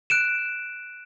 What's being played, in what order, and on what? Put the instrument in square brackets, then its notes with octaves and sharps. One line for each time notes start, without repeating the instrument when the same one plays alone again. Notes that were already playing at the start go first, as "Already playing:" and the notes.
[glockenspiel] F#6 D7 E7